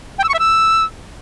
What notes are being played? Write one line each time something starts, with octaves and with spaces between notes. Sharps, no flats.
G5
E6
C#6
E5
E6